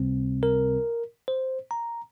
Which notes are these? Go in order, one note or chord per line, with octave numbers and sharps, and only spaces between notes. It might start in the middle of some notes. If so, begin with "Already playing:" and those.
Already playing: C#2 C3 G3 C4
A#4
C5
A#5